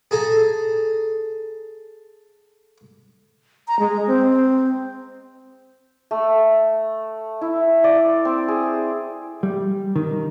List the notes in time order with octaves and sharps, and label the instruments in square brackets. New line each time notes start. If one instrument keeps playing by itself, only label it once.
[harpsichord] G#4 A4 G#5 A#5
[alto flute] A#5
G#3
C4
[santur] A3
E4
D5
C4
G#4
[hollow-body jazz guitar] G3
D#3